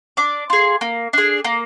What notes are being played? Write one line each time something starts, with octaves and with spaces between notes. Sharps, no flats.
D4 D6
F4 G#4
A#3
D4 G#4
A#3